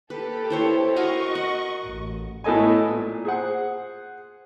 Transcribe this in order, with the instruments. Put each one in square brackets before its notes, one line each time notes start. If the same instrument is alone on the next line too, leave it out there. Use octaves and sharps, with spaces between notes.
[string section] A#3 G4 A4 [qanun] B4
[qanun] E4 C5 C#5
[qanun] F#4 A#4 F5 [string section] D#5 C#6
[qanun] F#5
[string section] A1
[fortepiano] A2 B3 A4 D#5 G#5
A#2
G#4 C5 F#5